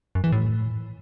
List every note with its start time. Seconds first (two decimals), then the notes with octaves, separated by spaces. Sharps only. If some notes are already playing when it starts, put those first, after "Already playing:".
0.15 F#2
0.24 E3
0.32 A2